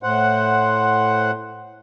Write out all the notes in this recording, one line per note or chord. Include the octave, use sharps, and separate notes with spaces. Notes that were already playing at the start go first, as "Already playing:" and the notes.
A2 C5 F#5